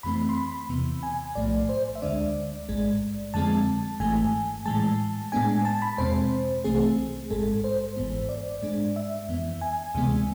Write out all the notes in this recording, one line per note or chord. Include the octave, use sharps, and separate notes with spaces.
F2 E3 A3 C4 B5
C6
B5
E2 C3 E3 B3
G#5
B1 A2 F3 A3 D5
C5
E5
D2 D3 G#3 D4 D5
A1 G#2 G#3
F2 D3 F3 G#3 C4 A5
G#1 G#2 E3 A3 G#5
A2 E3 G#3 A5
A2 G#3 B3 D4 G#5
A5
B5
E2 B2 G#3 C4 C5
C2 C3 E3 A3 C4 G#4
A1 G#2 G#3 A4
C5
G#1 G#2 E3 B3
D5
G#2 G#3 D4
E5
F2 E3 B3
G#5
D2 C3 E3 G#3 B3